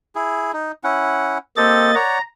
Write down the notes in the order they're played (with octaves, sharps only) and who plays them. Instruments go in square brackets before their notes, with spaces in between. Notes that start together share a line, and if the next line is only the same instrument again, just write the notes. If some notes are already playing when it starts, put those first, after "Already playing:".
[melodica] E4 G#4
D#4
C#4 E4 F#5
[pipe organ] A#3 D#5 A6 [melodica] C4 G4 A4
[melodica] C#5 D5 F#5 [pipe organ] A#5